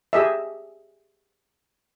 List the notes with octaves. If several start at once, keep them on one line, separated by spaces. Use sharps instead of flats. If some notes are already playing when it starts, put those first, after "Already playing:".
G4 G#4 D#5 E5